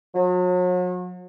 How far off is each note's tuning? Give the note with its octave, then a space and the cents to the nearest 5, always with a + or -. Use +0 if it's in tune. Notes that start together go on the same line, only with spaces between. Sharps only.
F#3 -40